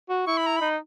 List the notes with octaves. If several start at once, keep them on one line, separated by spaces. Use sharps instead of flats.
F#4
E4 C#6
B5
A#5
D#4 B5